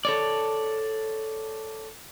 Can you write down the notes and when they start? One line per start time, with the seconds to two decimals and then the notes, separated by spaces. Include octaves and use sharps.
0.05 A4 C#5 D5